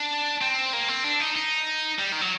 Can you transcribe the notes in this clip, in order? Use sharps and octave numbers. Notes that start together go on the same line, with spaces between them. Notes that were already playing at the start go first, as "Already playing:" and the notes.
Already playing: D4
C4
A#3
C4
D4
D#4
D#4
G3
D#3
F#3